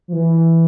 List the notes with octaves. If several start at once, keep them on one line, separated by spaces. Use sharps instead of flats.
F3
E3